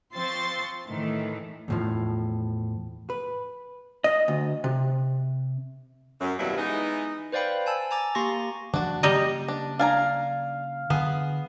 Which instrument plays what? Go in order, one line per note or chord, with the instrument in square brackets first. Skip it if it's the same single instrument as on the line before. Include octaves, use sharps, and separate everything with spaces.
[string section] F3 C4 C5 C6 C#6 A6
A2 D#3 E3 A3
[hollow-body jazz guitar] E2 A2 F3
B4
D#5
D2
C3
[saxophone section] F#2
D#2 B2 E3 F#3 G3 E4
E3 G#3 B3 D#4
[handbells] B4 C5 D5 F5 G5 B5
G#5 A5 E6
G#5 A#5 D6 A6
A#3 G4 A#5 C6 C#6 A#6
[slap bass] E3 F#3 A3 [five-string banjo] D4 F#4
[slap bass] C#3 F#3 A#3 [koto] G3 D#5 [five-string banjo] A#5
[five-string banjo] D4
[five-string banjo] D4 G#5 A#5 [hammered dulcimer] F5
[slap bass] D3 E3 F#3 [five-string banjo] B3 G#4